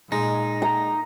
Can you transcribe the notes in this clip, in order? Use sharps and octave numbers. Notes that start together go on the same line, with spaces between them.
A#2 G#3 D#4
A#5